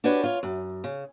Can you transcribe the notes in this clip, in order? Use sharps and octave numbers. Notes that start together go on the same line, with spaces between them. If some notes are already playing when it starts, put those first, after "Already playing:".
D4 F#4 G4 B4 C#5
F4 C#5
F#2
C#3